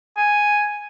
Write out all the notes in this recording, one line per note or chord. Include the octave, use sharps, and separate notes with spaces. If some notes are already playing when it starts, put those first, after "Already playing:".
G#5